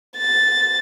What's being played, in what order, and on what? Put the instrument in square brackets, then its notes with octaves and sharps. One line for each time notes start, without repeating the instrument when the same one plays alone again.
[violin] A6